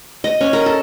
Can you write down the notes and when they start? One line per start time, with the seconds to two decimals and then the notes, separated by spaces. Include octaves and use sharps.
0.24 D#5
0.41 C#4
0.53 A#4
0.66 A4